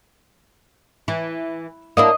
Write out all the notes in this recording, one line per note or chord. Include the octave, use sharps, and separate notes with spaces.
E3
A#3 D4 E4 D#5